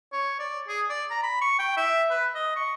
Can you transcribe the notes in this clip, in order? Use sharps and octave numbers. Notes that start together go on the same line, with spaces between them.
C#5
D5
G#4
D5
A#5
B5
C#6
G5
E5
B4
D#5
C#6